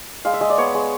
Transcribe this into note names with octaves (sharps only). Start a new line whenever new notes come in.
G#3 F5
E5
G#3 D#5
D5
B3 C#5
G#3